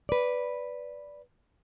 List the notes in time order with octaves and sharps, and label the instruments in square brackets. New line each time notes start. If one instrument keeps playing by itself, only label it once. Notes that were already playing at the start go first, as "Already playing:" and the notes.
[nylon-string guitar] B4 D5